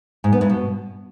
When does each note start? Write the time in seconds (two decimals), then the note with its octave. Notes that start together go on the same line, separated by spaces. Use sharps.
0.24 G#2
0.33 B3
0.41 G2
0.50 B2